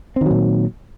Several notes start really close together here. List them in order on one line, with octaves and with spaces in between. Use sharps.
C4 D#3 F#3 A#2